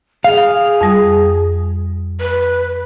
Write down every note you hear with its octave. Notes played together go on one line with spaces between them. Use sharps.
G#4 F5
F2 G3 D#6
B4